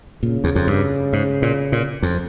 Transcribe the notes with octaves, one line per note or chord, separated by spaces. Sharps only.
A#2 C#3
E2
F2
G2
G#2
A#2
A#2
F2